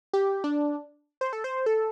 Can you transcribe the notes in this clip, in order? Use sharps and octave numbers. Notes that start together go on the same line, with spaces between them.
G4
D4
C5
A4
C5
A4